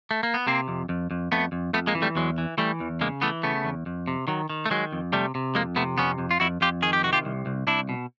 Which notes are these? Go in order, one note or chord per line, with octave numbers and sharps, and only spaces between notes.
A3
A#3
B3
C3 A#3 C4
F2
F2
F2
F2 A3 B3
F2
F2 A3 B3
G#3 A#3
E3
G3 A3
E2 F#3 G#3
E3
E3 G3 A3
E2
C#3 G#3 A#3
E3 A3 B3
C#3 A3 B3
E2
F2
C3
D#3 F#3
D#3
A3
D#3 F#3 G#3
F2
C3 G3 A3
C3
F2 G#3 A#3
C3 A3 B3
F2 B3 C#4
F2
F4
F2 E4 F#4
F2 F4 G4
D#3 G#4
G4
C3 F#4
F4 G4
C2
C2
C2 D4 E4
B2